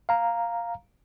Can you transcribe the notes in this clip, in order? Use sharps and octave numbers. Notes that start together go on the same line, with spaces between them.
F5 A#5